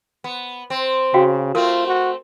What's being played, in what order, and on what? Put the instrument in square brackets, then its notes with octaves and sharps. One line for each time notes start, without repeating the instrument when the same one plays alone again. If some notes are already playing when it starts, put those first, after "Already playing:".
[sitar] B3
C4
[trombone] C#3 [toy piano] F#4 F5 G5
[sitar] A3 C4 [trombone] F4 [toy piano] A#4
[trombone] F#4